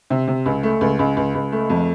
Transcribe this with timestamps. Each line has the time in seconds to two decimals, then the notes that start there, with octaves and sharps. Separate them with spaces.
0.10 C3
0.28 C3
0.46 C#2
0.63 A3
0.81 C#2
0.99 C#2
1.17 C#2
1.35 C#2
1.52 A3
1.69 F2